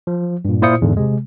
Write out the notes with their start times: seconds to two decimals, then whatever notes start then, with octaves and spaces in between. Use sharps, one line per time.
0.07 F3
0.45 G2 A#2
0.62 A#2 E4 F4 C5 D#6 C#7
0.82 E2 G#2 D3
0.97 C3 G#3